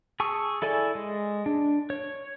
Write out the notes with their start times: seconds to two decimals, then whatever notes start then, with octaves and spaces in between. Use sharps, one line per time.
0.20 G#4 A5 C#6 E6
0.62 E4 A4 D5 G#5
0.95 G#3
1.46 D4
1.90 C#5